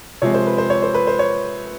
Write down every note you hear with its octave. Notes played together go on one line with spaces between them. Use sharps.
C3 F3 G#3 C#5
C5
B4
C5
C#5
C5
B4
C5
C#5